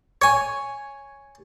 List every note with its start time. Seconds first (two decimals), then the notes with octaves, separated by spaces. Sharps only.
0.22 C#5 G#5